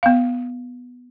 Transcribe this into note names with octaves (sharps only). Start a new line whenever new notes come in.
B3 F5